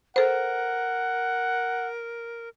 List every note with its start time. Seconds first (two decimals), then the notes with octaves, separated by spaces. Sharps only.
0.16 A4 A#4 C5 F#5